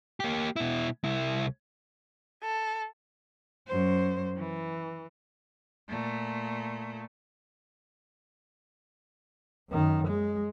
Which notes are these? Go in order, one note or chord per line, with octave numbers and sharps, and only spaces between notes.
A#3 G4
B2 E4
C2 E4
A4
F#2 C5
E3
A#2 A3
F#2 D#3
G#3